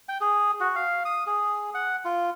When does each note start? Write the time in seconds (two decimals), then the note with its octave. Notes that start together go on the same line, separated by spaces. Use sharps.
0.09 G5
0.21 G#4
0.60 F#4
0.76 F5
1.05 D#6
1.27 G#4
1.74 F#5
2.05 F4